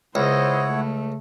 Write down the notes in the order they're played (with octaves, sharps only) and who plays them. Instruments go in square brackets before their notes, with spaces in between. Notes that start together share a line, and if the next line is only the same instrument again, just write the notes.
[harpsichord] C#2 [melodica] E4 C#5 F#5 [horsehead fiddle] C5 D#5
[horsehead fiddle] A3